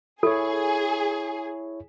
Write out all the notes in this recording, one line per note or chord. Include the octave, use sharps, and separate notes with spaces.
E4 G#4 A4 C#5